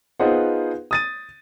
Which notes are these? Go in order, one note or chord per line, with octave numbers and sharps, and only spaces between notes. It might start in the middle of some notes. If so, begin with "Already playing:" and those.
B3 D#4 F4 G#4 C5 F#5
D#6 A6 D#7